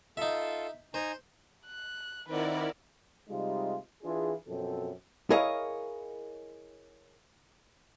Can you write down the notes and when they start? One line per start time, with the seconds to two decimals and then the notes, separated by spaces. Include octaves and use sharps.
0.17 D#4 F4 A4 E5
0.94 D#4 C5 G#5 A#5
1.66 F#6
2.29 D#3 C4 E4 A#4 B4 D5 F#5
3.30 C3 G3 G#3 D#4 F4
4.04 E3 D4 F4 G#4
4.48 F#2 B2 F3 C4 A4
5.30 E4 G#4 A#4 C#5 D#5 F5